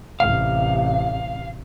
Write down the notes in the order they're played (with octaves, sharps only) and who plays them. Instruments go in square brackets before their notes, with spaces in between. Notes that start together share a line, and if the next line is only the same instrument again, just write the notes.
[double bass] A1 C3 [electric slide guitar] F5